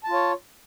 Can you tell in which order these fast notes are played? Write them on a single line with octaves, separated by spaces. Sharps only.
A5 F4 C#5